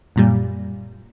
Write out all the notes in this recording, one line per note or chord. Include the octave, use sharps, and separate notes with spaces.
F#2 A#2 G3